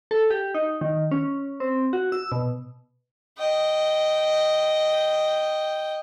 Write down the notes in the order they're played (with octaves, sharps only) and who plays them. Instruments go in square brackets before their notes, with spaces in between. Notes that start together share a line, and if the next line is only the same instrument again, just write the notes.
[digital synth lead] A4
G4
D#4
D#3
C#4
C4
F#4
E6
B2
[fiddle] D#5 G5